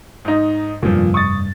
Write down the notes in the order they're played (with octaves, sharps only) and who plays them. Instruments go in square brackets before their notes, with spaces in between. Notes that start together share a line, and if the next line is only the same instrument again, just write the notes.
[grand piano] G#2 D#4
[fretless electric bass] F1 G2 [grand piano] A#2 F3
[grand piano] C#6 D#6 A6